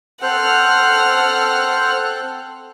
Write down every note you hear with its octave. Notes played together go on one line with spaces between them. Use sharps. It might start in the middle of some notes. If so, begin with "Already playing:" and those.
C4 A4 C5 F#5 F6 F#6